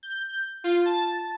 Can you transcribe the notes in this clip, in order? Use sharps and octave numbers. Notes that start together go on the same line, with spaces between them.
G6
F4
A5